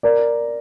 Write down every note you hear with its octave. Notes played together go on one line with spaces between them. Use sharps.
A#4 D5